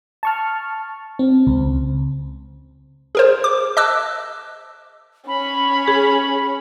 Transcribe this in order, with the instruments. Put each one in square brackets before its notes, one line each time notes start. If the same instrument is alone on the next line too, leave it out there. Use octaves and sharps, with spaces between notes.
[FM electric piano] A5 C#6 F6
C4
C#2
[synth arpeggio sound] G#4 A#4 C5
D6
D#5 A5 D6 E6 F#6
[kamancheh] C#4 [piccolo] B5
[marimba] G#4